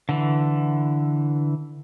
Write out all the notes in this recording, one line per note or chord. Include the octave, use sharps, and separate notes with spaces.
D3 E3